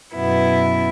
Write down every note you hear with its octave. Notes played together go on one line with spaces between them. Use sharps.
F#2 B2 B3 E4